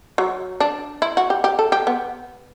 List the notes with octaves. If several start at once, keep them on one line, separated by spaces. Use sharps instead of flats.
F#3
D4
E4
F#4
G4
G4
A4
G4
B3